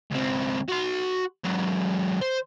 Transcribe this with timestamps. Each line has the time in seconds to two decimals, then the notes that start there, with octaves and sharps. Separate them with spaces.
0.11 C#2 C4
0.69 F#4 C6
1.44 G#2 F#3
2.21 C5